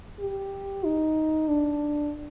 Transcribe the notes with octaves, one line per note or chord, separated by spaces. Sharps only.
G4
D#4
D4